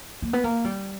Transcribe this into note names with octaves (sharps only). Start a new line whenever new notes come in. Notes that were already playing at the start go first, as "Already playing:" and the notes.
A#3
B3
A#3
G3